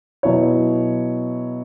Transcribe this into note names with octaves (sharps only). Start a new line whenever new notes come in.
B2 F#3 E4 C#5